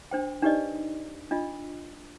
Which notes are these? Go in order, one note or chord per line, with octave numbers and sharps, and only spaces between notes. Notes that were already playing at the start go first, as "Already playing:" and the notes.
D4 C5 G5
D4 D#4 G4 B4 D5 D#5
D4 F4 D#5